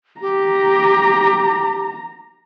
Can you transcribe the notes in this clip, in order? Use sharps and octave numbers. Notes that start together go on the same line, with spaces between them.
G4 A#5